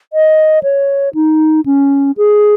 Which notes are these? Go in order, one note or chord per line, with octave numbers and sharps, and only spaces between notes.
D#5
C#5
D#4
C#4
G#4